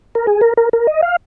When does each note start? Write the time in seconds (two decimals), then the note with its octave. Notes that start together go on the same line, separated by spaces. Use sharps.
0.15 A#4
0.27 G#4
0.41 A#4
0.57 A#4
0.73 A#4
0.87 D#5
1.02 F5